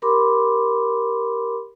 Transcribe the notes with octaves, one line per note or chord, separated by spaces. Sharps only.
G4 A#4 B5 C6 D6